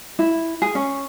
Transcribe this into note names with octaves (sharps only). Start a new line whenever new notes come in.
E4
G#4
C#4